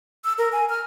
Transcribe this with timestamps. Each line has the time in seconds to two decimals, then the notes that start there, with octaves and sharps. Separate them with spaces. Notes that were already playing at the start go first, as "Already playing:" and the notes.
0.25 E6
0.38 A#4
0.52 G#5
0.69 F6